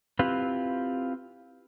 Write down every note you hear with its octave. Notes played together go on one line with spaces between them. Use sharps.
C4 E4 F4 G4 B4